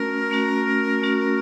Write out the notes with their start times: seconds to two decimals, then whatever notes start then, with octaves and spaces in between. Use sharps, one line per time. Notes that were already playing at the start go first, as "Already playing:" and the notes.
Already playing: A3 C#4 F#4 A#4
0.31 A3 C#4 F#4
1.02 A3 C#4 F#4